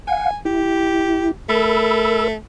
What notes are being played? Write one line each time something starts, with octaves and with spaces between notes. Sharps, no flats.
F5 F#5 G#5
E4 G4
A3 A#4 B5 E6